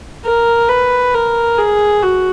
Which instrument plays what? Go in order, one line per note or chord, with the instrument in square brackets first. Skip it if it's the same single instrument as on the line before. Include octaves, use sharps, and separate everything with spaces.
[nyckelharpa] A#4
B4
A#4
G#4
F#4